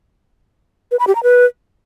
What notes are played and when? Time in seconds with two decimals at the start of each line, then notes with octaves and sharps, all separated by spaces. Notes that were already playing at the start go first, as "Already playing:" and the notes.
0.91 B4
0.99 B5
1.07 G4
1.15 A#5
1.23 B4